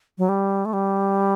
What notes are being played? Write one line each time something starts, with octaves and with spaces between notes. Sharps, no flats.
F#3
G3
A3
G3